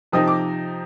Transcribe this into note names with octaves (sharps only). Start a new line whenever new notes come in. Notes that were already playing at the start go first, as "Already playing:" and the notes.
C3 F3 C4 D#4 D#6
D6